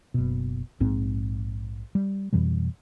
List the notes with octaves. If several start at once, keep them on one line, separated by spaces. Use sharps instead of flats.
F#1 B2
A#1 G#2 C4
G3
F2 B2 E3 G3